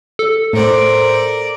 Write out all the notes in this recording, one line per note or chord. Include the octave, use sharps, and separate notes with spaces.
A4
A2 A#4 C5 D5